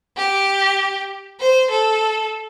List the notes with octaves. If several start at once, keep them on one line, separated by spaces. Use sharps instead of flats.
G4
C5
A4